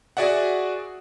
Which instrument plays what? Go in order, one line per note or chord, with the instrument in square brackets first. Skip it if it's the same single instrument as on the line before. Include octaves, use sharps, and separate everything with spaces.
[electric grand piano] F#4 G#4 D5 E5 F#5